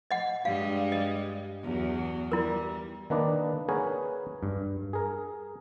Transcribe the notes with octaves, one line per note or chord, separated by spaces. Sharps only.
D#5 F#5
G2 G3 G#3 F5
D#5
E2 F#3
G3 E4 A#4
D#3 A#3 D4 B4 D5 D#5
G#4 A#4 B4 C#5 F#5 G#5
G2
G#4 A#4